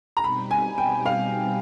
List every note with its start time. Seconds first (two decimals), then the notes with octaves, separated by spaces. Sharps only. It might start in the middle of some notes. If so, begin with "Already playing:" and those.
0.17 A#5
0.23 B2 G3 C4 D#4 G4 B5
0.51 G#5
0.78 G5
1.06 F5